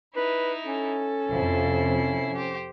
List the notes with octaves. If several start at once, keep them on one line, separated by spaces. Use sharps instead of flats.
D#4 E4 B4
C#4 A4
F2 C3 F3 E4 C7
G4 C5